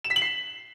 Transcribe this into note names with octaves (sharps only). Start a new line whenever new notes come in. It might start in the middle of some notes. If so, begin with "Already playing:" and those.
E7
B6
F#7
C7